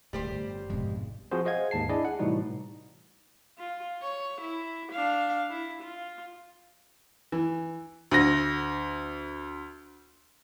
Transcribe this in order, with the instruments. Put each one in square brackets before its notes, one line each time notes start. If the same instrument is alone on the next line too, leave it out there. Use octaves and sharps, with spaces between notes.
[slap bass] D1 [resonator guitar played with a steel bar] G3 G4 C5 [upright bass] A3
[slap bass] G1
[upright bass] G#1 B2 [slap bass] F2 G#3
[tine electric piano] F3 C4 F#4 G#4 C5
G#4 C5 D#5 F5 F#5 G#6
D#2 G#2 A5 C7
D4 E4 G#4 D5 D#5
F#5
A2 C3 E3 G3 D#4 F#4
[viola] F4
C#5
E4
D4 F5
E4
F4
[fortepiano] E3
[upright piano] D2 A#6